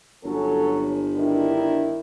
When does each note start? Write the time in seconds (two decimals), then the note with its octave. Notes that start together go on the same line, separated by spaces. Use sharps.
0.24 G1 F#3 C#4 A4
1.16 D#3 D4 E4